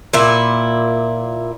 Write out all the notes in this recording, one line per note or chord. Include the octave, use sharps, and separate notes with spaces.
A#2 E4